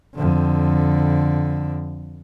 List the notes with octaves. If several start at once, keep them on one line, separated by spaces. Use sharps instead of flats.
F2 D3